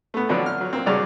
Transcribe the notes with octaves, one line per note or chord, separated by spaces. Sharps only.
A3 B3
D3 F3 F#3 B3 C4 D4
F6
F#3
A#3 C4
G2 C#3 D4 F#4 D5